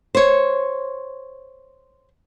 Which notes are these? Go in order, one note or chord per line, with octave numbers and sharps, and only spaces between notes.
C5 C#5